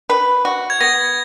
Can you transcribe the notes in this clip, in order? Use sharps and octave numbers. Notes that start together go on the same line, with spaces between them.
B4
F#4
G#6
B3 A#6